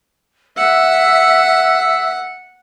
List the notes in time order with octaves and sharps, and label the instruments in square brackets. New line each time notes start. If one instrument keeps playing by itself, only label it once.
[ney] E5 [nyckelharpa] F#5 [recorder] E6